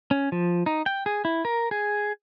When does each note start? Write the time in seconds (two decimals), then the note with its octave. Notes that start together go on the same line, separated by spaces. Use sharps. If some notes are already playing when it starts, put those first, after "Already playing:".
0.11 C#4
0.32 F3
0.66 D#4
0.86 G5
1.06 G#4
1.25 E4
1.45 A#4
1.71 G#4